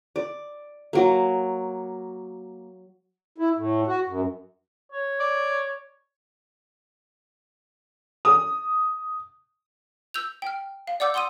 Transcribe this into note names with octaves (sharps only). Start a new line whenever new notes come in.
D5
F#3 A#3
E4
A2
F#4
F#2
C#5
D5
D#6
E6 G6 F7
G5 F6
F5
D5 F#5 D6 E6 G6
F#5 C6 D#6 E6 D#7